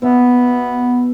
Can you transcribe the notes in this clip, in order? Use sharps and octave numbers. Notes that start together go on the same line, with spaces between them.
B2 B3 E5